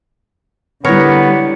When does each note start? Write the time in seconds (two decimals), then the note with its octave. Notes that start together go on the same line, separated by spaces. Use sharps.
0.85 D3 G3 B3 E4 A#4 C#5 C#7